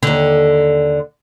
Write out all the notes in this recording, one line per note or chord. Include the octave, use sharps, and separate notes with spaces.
D#2 D3